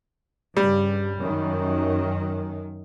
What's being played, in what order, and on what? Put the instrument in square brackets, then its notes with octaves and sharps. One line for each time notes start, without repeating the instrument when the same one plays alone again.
[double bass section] G2 C#3 [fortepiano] G3
[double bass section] F#2 D#3